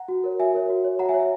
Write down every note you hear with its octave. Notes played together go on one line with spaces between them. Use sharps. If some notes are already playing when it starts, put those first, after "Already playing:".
Already playing: F#5 A#5
F#4
A#4 C#5
F#4 E5 G#5
A#4 C#5
F#4
C#5
F#4 F#5 A#5
E5 G#5
C#5
E5